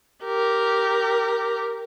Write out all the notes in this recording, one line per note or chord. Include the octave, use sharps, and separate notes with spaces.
G4 A#4